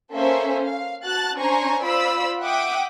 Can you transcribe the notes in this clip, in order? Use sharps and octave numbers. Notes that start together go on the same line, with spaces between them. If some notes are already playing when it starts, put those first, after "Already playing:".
A#3 C#4 A4 C5 E5
F5
F#4 A5 F#6 A6
C#4 D4 C5 G#5 A#5 C#6
F4 C5 D5 B5 E6
E5 F#5 G5 D6 D#6